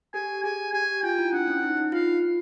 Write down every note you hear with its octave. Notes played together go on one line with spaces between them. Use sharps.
G4 A4 G#5
G#4 G#5
G4 G#5
F4 G5
E4
D4 F#5
C#4
D#4
D#4
F4 F5